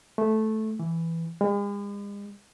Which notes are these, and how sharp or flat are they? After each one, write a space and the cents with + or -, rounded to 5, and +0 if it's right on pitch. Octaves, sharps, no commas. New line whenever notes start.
A3 -10
E3 +5
G#3 -45